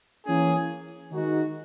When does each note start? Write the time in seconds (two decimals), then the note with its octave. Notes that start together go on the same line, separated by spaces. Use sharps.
0.25 E3 A#3 C#4 G#4
1.11 D#3 G#3 D#4 F#4